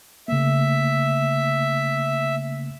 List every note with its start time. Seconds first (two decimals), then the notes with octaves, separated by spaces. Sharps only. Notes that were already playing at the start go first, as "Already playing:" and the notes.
0.28 C#3 A3 A#3 E5